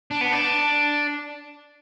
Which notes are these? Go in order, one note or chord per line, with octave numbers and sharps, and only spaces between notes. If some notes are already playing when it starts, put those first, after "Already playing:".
D4
B3
D4